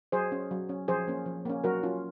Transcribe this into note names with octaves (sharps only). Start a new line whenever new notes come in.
F#3 G#4 C5
C#4
F#3
C#4
F3 G#4 C5
A#3 C#4
F3
A#3 C#4
F#3 F#4 A#4
C#4 F4